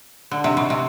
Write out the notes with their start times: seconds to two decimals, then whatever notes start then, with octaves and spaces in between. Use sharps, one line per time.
0.31 D3
0.44 C3
0.57 B2
0.70 C3